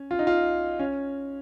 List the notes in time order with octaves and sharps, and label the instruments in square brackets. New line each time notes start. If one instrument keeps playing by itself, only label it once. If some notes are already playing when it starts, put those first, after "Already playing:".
Already playing: [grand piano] C#4
F4
D#4
F4
C#4